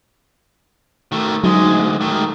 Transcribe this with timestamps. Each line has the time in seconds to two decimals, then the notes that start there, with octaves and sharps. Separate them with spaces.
1.12 D#3 A3
1.44 D2 F#3 G#3 D#4
2.01 D#3 A3